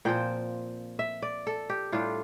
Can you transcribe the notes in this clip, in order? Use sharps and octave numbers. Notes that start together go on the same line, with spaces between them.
A#2 F3 C4 G5
E5
D5
A4
G4
A2 G3 D4 F4